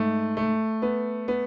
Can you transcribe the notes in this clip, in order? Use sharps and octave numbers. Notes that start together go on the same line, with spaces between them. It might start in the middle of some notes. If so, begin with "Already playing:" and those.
Already playing: G#2 A3
A3
B3
B3